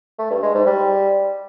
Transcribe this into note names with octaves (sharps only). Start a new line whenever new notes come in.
A3
G2
G#3
G#2
G3